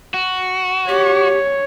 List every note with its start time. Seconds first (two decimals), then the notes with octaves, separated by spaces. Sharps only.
0.14 F#4
0.88 G4 C#5